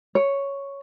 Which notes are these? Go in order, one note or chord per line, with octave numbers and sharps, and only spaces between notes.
C#5